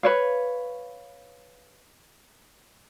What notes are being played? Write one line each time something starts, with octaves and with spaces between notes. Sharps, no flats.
B4 C#5 F5